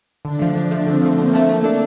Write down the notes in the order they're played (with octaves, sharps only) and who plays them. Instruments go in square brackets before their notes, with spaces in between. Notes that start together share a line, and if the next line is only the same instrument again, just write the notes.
[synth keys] D3 [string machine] D4
[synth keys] F3 A3
D3
F3 A3
[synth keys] D3 [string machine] C4
[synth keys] F3 A3
[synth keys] D3 [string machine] A#3
[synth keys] F3 A3
A3
D4 A4